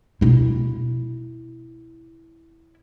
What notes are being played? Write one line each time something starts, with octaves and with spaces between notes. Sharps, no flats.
B2 E4